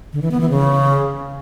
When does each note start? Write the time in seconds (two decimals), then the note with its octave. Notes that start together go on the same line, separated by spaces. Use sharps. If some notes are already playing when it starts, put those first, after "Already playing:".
0.13 D3
0.22 E3
0.31 B3
0.41 E3
0.50 C#3